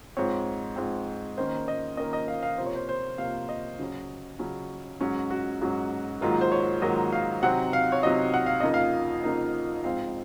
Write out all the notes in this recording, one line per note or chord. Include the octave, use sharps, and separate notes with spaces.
G#2 F3 C4 C#5
G#2 F3 C4
D#3 A#3 C#4 C5
D#5
D#3 A#3 C#4 D#5
D#5
F5
F5
C3 F3 A#3 C5
C#5
C5
C5
C3 F3 A#3 F5
D#5
C#3 F#3 C#4
C#3 F#3 C#4
G#2 F#3 C#4
F#4
G#2 F#3 C#4
G#2 D#3 F#3 A#3 F4
C5
C#5
G#2 D#3 F#3 A#3 D#5
F5
C3 F#3 C4 D#4 F#5
F5
C#5
C3 F#3 C4 D#4 D#5
F#5
F5
F2 C#3 F3 A#3 D#4 D#5
F5
F2 C#3 F3 A#3 D#4
G#2 F3 C4 F5